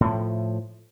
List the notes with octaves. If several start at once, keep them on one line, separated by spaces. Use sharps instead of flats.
A2 F3